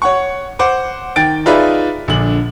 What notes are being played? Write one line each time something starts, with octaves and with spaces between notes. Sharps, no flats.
C#5 F#5 C#6
C5 F#5 D6
D#3 G5 A6 D7
D#4 F4 G#4 B4 D5 E5
A#1 D3 F#7